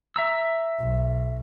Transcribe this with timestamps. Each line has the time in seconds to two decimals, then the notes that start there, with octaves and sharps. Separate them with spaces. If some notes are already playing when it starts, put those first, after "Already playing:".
0.16 E5 A#5 E6
0.79 B1